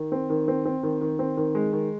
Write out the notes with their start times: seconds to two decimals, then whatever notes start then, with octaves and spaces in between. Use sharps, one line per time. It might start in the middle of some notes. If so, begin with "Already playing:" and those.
Already playing: D#3
0.12 C4
0.30 D#3
0.48 C4
0.65 C4
0.83 D#3
1.01 D#3
1.19 C4
1.37 D#3
1.55 G#3
1.73 D#3